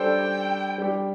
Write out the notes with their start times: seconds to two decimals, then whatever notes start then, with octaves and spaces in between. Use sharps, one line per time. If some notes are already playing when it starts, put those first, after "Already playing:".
Already playing: G3 D4 A4 C5 G5
0.78 G3 D4 G4